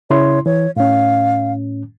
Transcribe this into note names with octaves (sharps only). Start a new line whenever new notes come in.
C#3 E4 C#5 C6
E3 C#5
A2 C#4 F5